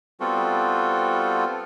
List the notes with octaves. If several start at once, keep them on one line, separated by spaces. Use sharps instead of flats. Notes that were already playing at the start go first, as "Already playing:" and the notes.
G3 B3 C4 F4 F#4 A4